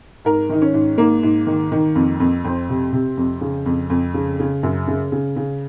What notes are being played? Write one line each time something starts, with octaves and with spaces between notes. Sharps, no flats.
G#2 A#4
D#3 D#4
C#4
G#2
G#2 A#3
G#2
D#3
D#3
F2
F2
F2 C4
C3
C3
F2
C#3
F2
F2
C#3
C#3
F#2
C#3
C#3
C#3